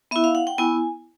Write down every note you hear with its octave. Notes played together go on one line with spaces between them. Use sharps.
B3 E4 E5
F5
F#5
G5
B3 E4 G#5